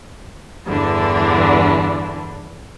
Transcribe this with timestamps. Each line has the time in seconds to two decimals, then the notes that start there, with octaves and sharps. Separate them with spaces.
0.66 E2 G2 D3 E3 D4